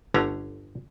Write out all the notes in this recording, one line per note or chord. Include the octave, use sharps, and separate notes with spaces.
G1 D3 A3 C#4 A#5